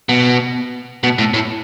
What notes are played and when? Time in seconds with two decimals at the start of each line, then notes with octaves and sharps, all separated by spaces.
0.09 B2
1.03 B2
1.18 A2
1.34 A2